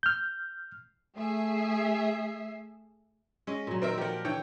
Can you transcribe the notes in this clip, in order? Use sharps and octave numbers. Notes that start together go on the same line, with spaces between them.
F6 G6
A3 G#4 E5 C7
G#3 C#4 D#5
A#2 F#3
D#3 C4 A#4 E5
F3 G4 A#4 F#5
D3 E3 C#5 G5